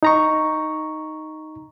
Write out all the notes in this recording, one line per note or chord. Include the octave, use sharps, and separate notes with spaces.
D#4 A#5 C#6